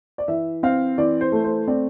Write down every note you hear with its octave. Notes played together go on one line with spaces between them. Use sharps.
D5
E3 E5
C4 F5
E3 D5
C5
A3
C5
C4 D5